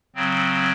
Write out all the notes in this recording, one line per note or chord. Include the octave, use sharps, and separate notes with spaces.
C#3 F#3 C4